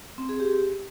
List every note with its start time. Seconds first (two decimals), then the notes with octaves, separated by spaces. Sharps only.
0.18 C4
0.29 G#4
0.40 G4